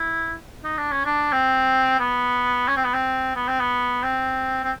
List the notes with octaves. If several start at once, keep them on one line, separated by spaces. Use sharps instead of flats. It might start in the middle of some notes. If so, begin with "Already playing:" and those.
Already playing: E4
D#4
D4
C#4
D4
C4
B3
C#4
C4
B3
C4
B3
C4
B3
C4
C4